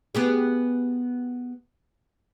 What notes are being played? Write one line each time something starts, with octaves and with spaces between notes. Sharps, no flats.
B3 G4 G#4